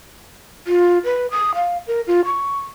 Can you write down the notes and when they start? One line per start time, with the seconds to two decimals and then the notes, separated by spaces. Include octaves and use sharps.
0.67 F4
1.04 B4
1.31 D#6
1.55 F5
1.87 A#4
2.07 F4
2.25 C#6